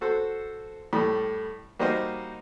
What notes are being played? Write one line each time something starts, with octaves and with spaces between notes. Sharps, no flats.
F#4 A4 C5
A2 G3 A3
G3 A#3 D#4 F#4 C5 D#5